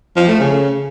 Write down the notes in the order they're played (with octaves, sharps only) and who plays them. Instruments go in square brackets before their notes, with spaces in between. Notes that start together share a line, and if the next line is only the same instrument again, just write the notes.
[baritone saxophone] F3
A3
C#3